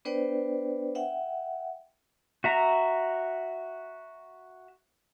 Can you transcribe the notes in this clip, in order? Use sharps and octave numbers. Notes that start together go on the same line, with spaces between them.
B3 D4 B4 C5 D5 G5
E5 F#5 G5
F#4 E5 A#5